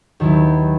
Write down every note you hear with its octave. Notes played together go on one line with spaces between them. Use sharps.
D#2 D#3 F#3 B3 E4